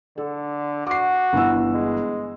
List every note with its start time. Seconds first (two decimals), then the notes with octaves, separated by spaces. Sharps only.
0.18 D3 A4
0.87 F#4 D6 C7
1.33 G1 E3 E6
1.74 G#3